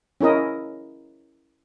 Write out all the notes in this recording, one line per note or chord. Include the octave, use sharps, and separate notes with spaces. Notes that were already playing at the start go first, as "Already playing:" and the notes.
C#4 E4 A#4 D#5